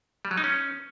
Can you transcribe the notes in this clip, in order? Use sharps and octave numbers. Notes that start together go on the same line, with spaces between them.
G3
F#3
D#4
C#4